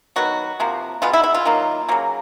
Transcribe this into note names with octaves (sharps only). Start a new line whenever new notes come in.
D#3 F#3 B3 F#4
C3 F3 A#3
B2 G#3 B3 F4
E4
E4
F4
D#3 F#3 A#3
C#3 F#3 A#3